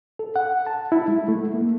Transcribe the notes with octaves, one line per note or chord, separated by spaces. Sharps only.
A4
F#5
A5
E4
G#3
A3
A#3